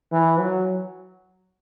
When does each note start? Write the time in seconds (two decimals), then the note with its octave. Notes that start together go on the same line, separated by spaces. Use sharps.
0.12 E3
0.39 F#3